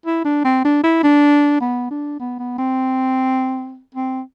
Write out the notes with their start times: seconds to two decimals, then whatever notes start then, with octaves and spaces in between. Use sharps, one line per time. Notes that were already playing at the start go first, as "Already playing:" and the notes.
0.06 E4
0.25 D4
0.44 C4
0.64 D4
0.83 E4
1.03 D4
1.61 B3
1.91 D4
2.20 B3
2.39 B3
2.58 C4
3.95 C4